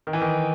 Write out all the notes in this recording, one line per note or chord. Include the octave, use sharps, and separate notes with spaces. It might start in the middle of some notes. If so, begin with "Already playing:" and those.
D#3
E3
D#3